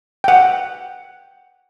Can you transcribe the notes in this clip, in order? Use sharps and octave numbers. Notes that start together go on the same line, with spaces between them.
F#5 G5